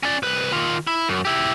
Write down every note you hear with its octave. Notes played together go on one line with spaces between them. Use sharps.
C#4 D5
C2 B4
D#3 F4
E4
F#2
E4 G4